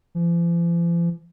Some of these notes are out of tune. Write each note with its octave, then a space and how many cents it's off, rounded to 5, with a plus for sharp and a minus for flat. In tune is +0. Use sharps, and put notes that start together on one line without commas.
F3 -45